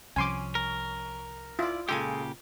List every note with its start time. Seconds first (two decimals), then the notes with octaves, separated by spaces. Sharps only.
0.16 C2 C3 F3 C#4 G#5 C6 D6
0.55 A#4
1.59 E4 F4 D5
1.89 A#2 C#3 G#3 G4 A4 G#5